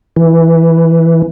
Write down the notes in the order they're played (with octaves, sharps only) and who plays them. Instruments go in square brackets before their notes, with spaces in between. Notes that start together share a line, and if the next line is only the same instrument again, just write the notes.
[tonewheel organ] E3